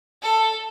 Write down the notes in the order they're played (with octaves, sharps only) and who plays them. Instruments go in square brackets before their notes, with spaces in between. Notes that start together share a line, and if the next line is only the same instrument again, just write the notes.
[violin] A4